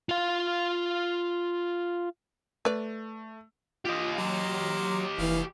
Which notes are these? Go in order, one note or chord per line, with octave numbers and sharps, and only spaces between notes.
F4 F5
A3 B4 D5
F4 G4 D#5
F#3 A#5 C6 D6
F1 E3 G3 F5